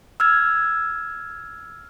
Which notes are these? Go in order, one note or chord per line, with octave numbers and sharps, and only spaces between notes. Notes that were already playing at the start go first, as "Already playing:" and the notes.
E6 F6 G#6